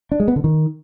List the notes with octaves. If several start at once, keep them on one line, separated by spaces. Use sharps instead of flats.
D4
G#3
B3
D3
D#3